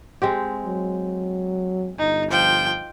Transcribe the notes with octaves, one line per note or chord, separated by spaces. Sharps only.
G#3 C4 G4
F#3
G1 D#4
F3 G5